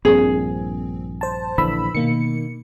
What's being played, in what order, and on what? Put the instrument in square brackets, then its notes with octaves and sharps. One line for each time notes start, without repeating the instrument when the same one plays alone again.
[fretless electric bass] A#1 G2 A#2 [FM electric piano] C4 [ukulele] G#4
[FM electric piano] C5 A5
[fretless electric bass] A#1 D3 E3 [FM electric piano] B5 E6
[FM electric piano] B2 A#3 C#7 [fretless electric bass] D#3